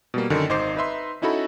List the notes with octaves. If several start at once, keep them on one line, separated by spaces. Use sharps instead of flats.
B2 G3 A#3
F#2 D3 D#3
G#1 D#4 C5 D6 C7
D#4 B4 E5 C6
C#4 D#4 E4 F#4 A4 B5